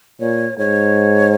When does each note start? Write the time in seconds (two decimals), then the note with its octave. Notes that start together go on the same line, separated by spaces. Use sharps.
0.20 A#2 C#5
0.58 G#2 C#5